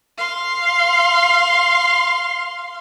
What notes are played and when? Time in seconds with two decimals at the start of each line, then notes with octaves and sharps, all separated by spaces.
0.18 F5 C6